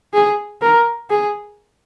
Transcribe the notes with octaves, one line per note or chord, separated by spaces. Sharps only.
G#4
A#4
G#4